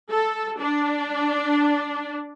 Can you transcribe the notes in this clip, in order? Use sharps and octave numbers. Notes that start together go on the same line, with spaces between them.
A4
D4